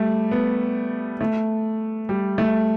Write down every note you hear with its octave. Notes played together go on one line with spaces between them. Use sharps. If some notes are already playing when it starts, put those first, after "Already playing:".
Already playing: G3 A3
B3
A3
G3
A3